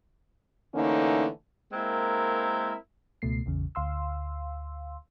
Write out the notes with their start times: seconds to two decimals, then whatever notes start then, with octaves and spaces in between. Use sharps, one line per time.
0.74 D3 E3 A3 A#3 C#4 D#4
1.72 G#3 A#3 C4 E4 A#4
3.22 C#2 B2 A3 C7
3.46 A1 E2 C#3
3.75 D2 F5 C6 E6